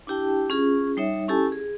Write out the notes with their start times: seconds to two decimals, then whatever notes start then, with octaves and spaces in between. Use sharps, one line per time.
0.07 D4 E4 G4 G5 A5
0.50 C#4 F4 G#4
0.97 G3 D#4 C#5 E5
1.28 C#4 E4 G4 A4 G#5 A5
1.52 G#4